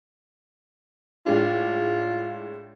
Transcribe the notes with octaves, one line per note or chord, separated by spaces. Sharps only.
A2 G#3 D4 F4